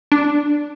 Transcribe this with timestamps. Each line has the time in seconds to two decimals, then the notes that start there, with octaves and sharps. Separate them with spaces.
0.12 D4